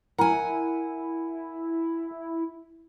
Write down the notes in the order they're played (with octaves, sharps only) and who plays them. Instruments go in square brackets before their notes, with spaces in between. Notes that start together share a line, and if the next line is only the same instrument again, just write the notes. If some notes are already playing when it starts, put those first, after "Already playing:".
[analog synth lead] E4 [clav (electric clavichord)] A#4 [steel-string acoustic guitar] F#5 G#5